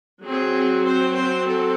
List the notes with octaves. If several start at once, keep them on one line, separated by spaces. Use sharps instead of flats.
F#3 C4 G#4
C5
C5
A4